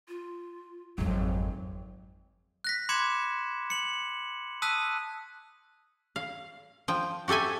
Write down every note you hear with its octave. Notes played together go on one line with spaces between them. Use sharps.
F4
G#1 F2 F#3
F#6 A#6 B6
B5 C6 D6 G#6 C#7 E7
C#7 F#7
A5 D#6 E6 F#6 B6 D#7
F5
F3 G5
F#4 G4 A4 E5 G#5